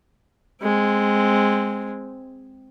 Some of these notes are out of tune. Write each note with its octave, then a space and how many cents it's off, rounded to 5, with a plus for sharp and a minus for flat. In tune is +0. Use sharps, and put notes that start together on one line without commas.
G#3 -5 C4 +0